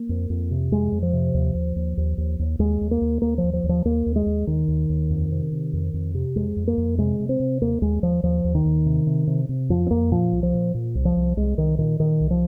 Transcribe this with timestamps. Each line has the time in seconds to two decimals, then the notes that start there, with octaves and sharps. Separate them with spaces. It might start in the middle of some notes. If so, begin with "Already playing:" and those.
Already playing: A#3
0.09 F2
0.30 F2
0.51 C3
0.71 F2 G#3
0.92 F2
1.02 F3
1.13 C3
1.34 D#2
1.55 D#2
1.76 D#2
1.97 D#2
2.18 D#2
2.39 D#2
2.59 D#2 G#3
2.81 D#2
2.91 A#3
3.01 D#2
3.22 D#2 A#3
3.38 F3
3.43 D#2
3.53 F3
3.64 D#2
3.69 F3
3.85 D#2 A#3
4.06 D#2
4.16 G#3
4.26 D#2
4.47 D#2 D#3
4.68 D#2
4.89 D#2
5.10 F2
5.31 C3
5.52 C3
5.73 F2
5.94 F2
6.15 C3
6.36 F2 G#3
6.56 F2
6.67 A#3
6.78 F2
6.98 C3 G#3
7.20 C3
7.29 C4
7.40 C3
7.61 D#2 A#3
7.82 D#2 G#3
8.02 D#2 F3
8.23 D#2 F3
8.44 D#2
8.55 D#3
8.65 D#2
8.86 C3
9.07 C3
9.27 C3
9.49 C3
9.70 F2 F3
9.87 C4
9.91 F2 A#3
10.11 A#2 F3
10.32 C2
10.43 F3
10.54 A#2
10.74 A#2
10.95 C2
11.05 F3
11.16 C2
11.37 C2 G#3
11.58 C2 D#3
11.78 A#2 D#3
11.99 A#2 D#3
12.20 C2
12.31 F3